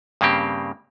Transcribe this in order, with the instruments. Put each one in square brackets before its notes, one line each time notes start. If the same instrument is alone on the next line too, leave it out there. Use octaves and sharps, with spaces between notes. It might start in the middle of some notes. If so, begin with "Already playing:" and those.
[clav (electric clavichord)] G2 C#3 A#3 C4 G4